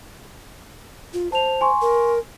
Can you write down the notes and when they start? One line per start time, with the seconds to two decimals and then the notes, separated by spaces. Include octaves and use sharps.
1.14 F4
1.32 C5 A5 F7
1.61 G#5 C6 C#6
1.82 A#4